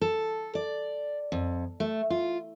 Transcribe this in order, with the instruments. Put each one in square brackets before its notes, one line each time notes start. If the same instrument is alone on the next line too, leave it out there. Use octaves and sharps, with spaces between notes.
[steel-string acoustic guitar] A4
D5
F2
A3
F4